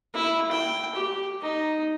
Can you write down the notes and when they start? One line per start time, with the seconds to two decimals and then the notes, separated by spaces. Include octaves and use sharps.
0.14 E4
0.51 G5
0.95 G4
1.42 D#4